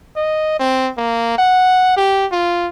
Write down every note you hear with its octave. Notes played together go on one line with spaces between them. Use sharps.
D#5
C4
A#3
F#5
G4
F4